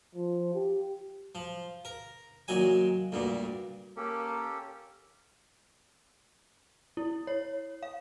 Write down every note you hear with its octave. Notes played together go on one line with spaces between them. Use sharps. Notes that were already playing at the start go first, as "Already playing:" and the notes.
F3
G4
F3
A#4
A#2 D#3 F#3 G#5
D2 G2 A#2
A#3 C#4 G4 A4
E4
C#5
F5